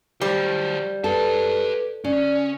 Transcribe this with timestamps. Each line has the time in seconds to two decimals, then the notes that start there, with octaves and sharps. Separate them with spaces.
0.21 F#3 G3 C5
1.04 G4 A4 B4 A5
2.05 C#3 C#4 D5